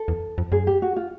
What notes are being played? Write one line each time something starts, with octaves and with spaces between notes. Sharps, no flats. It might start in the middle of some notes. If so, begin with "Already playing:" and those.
Already playing: A4
E2
F2
F#2 G#4
G4
F#4
F4